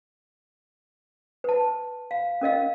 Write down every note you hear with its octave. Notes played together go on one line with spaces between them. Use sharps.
B4 A5
F5
C#4 A#4 D#5 F5